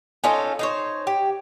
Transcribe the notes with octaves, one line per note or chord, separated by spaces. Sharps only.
C#4 D#4 F4 A4
D#4 C5 C#5
G4